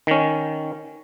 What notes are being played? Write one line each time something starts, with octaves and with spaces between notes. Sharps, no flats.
D#3 C#4